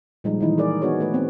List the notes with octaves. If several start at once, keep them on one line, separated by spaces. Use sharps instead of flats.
A#2 F3 G3 G#3 D#4
D#3 E3 D#4 E4
G#4 A#4 D5
B3 D#4 F#4 G#4 C#5
A3 B4
B3 C4